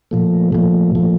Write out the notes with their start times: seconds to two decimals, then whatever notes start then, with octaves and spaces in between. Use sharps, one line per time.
0.11 A#2 F3 A3
0.53 A#2 F3 A3
0.95 A#2 F3 A3